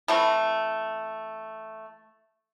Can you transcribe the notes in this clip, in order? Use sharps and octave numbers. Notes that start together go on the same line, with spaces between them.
E3 A3 C4